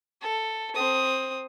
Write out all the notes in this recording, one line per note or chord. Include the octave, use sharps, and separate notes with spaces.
A4
C4 D#6